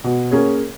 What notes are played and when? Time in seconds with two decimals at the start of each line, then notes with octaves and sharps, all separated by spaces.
0.04 B2
0.31 A#3 C#4 G#4 C#5